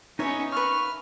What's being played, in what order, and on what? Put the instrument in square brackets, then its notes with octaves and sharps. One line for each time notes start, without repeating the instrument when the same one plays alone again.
[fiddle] B3 C#4 [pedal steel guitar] D#4 [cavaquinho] G#4 C#5 E5
[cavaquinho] B4 E5 F5 [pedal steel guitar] C#6 [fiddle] F6